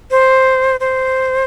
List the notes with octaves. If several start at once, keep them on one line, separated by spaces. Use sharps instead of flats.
C5
C5